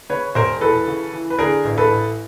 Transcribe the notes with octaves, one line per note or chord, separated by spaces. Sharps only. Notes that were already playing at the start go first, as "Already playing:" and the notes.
C#3 B4 C#5
E1 A#4 C5
E3 A4 B4
C#3
E3
B4
D3 G#4 A#4
A1
A4 B4
A1